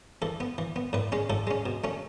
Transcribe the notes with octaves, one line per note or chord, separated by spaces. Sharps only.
E3 A4
B3
E3
B3
A2 B4
G#3 C#4
A2 A4
G#3 C#4
B2
A3 C#4